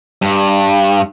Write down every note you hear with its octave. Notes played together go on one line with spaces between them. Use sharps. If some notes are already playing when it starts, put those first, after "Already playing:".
G2